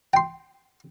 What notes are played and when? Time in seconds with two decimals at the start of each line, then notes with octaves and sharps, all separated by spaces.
0.13 G5 C6